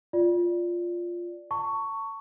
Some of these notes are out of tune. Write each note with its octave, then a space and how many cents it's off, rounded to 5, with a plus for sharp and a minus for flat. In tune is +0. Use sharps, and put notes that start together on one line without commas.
F4 +0 D5 +0
A5 +35 C#6 +10